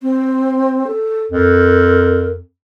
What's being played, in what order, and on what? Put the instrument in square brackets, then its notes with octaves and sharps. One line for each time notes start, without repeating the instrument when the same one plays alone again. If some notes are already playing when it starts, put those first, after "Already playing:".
[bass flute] C4
A4
[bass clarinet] F2 [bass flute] A#4